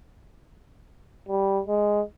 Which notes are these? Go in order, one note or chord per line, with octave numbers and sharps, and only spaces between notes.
G3
G#3